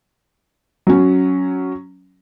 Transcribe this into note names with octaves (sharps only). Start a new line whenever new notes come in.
F#3 C#4